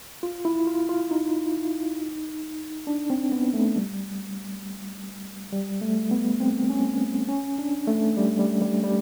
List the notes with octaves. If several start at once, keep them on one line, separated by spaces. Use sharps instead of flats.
F4
E4
F4
F4
D#4
D4
C4
B3
A3
G3
G3
A3
B3
C4
C#4
C#4
D4
A3
G3
G3
G3
G3